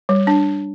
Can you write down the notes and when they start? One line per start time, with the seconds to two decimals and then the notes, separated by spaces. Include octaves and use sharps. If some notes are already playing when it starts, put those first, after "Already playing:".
0.09 G3
0.27 D4